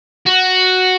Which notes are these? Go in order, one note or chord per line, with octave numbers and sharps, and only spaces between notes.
F#4